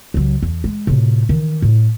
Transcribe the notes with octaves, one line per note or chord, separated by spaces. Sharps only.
C#2 F#3
E2
G#3
A2 C3
D#3 E3
A2